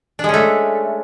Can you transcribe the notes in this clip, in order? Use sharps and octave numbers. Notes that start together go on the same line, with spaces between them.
G#3 A3 C#4 D4